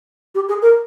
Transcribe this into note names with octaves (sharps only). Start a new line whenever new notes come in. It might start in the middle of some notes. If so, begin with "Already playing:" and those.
G4
G#4
A#4